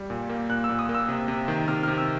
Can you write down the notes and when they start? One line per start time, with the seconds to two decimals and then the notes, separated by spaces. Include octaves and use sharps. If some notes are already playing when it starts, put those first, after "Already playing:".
Already playing: G3
0.10 A#2
0.29 A#3
0.49 A#2 F#6
0.64 E6
0.69 A#2
0.79 D#6
0.89 A#3
0.95 E6
1.09 C3
1.28 C3
1.48 D#3
1.68 C3 F6
1.83 C3 F6
1.98 E6